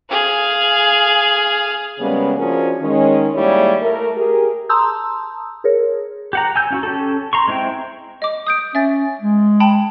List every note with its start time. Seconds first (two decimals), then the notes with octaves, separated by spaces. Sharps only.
0.11 G#4 F5
1.99 C#3 G3 G#3 A#3 B3 C#4
2.37 F3 C#4 D4 F#4 G#4 A#4
2.80 D#3 G#3 C#4
3.35 D#2 G3 G#3 A#3 E4 C#5
3.81 A3 A#4
4.16 G4 G#4 A#4
4.69 A5 A#5 C6 D#6 E6 G6
5.64 G#4 A#4 C#5
6.33 G4 F#5 A#5
6.56 G#5 E6 G6
6.71 C#4 F4 F#4
6.83 C#4 G4 A4
7.33 A#5 C6 C#6
7.48 G#3 C4 E4 C5 G5
8.22 D#5 D6
8.47 D#6 G6 D7
8.75 C#4 E5 A6
9.21 G#3
9.60 G5 A5 B5